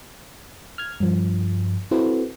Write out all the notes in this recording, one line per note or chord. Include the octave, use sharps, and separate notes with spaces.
F6 G#6
G2 F3
C4 E4 F#4 A4 B4 C5